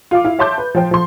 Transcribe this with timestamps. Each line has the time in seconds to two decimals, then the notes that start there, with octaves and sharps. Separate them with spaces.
0.11 F4 F5 D6
0.24 E4 F5
0.39 C#5 E5 A5 C6 D6 G6
0.58 B4
0.75 F3 C5 G5
0.91 F3 C6